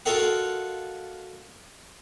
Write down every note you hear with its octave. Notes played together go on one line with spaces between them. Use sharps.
F4 F#4 A4 A#4 D#5 F#5